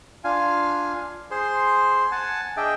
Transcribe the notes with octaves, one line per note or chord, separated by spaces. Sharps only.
D4 F4 F5 G#5
G#4 C5 C6
F#5 G#5 A5
D4 G#4 D#5 E5 G5